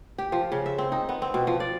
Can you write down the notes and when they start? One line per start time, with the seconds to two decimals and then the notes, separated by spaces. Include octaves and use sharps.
0.18 G4
0.32 F3
0.52 C#3
0.66 E5
0.78 C4
0.92 D#4
1.09 B3
1.22 C4
1.34 B2
1.47 F3
1.60 D5